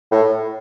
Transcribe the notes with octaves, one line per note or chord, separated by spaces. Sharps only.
A2